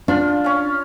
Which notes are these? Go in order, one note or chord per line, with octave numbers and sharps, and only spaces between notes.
D4 F4
C#4 F5